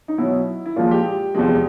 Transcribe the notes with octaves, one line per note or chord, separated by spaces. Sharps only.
D#4
B2 F#3 E4
E4
A#2 F3 G#3 F4
G4
E2 C3 F3 G#3